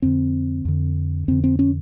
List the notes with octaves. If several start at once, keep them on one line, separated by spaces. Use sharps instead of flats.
F2 D3 C4
F2 D3
F2 D3 C4
C4
C#4